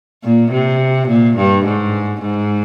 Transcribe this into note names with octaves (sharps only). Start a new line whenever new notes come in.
A#2
C3
A#2
G2
G#2
G#2